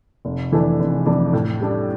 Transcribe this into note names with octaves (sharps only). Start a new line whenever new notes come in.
F1
F2 E3 A3 D4
F1
F2 E3 A3 D4
A2
G3 D4